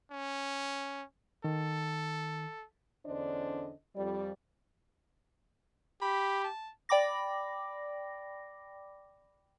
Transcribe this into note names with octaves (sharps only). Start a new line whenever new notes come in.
C#4
D#3 A4
E2 D3 C#4 D4 C5 D#5
F2 G3 D5
G4 B5
A5
D5 G5 B5 D6 A#6